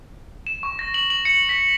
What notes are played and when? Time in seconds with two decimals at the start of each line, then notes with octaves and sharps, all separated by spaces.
0.47 E7
0.63 C#6
0.79 A#6
0.94 F#7
1.10 F#7
1.25 C#7
1.49 B6